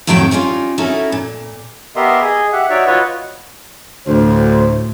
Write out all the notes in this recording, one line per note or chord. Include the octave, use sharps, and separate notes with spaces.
F2 A2 D#3 F#3 A4 G5
G3 C#4 D#4 F4
C#4 D#4 E4 F#4 A4 A#4
A#2
B3 G4 A#4 D#5 E5 C6
G#4 D#5
G4 E5 F#5
D#4 F#4 C#5 D5 E5
F4 F#4 B4 C#5 D#5
D2 A2 C5